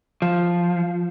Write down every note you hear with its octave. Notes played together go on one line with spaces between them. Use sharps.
F3